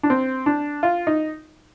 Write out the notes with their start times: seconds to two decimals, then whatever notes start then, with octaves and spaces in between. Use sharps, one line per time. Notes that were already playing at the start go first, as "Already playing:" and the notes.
0.03 D4
0.10 C4
0.46 D4
0.83 F4
1.07 D#4